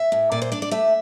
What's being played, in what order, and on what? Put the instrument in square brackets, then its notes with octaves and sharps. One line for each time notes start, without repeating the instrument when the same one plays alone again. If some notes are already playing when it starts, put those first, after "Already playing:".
Already playing: [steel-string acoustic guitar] E5
A2
A#2 D5
C5
D4 D5
D5
A3 E5